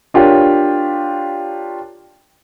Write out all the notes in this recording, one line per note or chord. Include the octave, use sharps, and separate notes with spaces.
D4 F4 G4 A#4 C#5